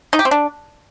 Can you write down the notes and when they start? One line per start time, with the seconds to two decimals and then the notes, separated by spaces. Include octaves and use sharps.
0.13 D#4
0.19 G4
0.25 C4
0.31 D4